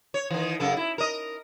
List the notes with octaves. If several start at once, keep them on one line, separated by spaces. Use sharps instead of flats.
C#5
D#3 E3
F#2 C#3 A4
E4
A#4 D#5